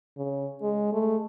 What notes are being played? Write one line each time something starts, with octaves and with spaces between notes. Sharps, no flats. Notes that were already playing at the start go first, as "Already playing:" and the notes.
C#3
G#3
A3